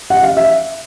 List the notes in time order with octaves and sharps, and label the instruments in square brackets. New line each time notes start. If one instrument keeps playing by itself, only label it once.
[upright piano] F#5
F5
E5